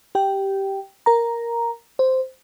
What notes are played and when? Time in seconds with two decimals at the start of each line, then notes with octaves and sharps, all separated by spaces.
0.15 G4 G5
1.06 A#4 A#5
1.99 C5